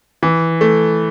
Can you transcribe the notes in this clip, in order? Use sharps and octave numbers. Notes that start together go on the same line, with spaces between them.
E3
A3